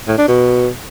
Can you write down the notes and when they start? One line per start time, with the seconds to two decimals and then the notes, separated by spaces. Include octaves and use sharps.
0.08 A2
0.18 D4
0.28 B2